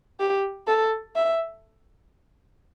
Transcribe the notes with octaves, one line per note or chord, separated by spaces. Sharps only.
G4
A4
E5